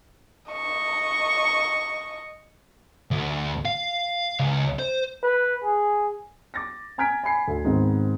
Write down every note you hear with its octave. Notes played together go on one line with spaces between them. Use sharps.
D#5 C#6
D2
F5
C#2
C5
B4
G#4
D6 A6 A#6
G#5 A#5 F6 G#6 B6 D7
G#5 B5 C7
D2
G#2 D#3 B3 C4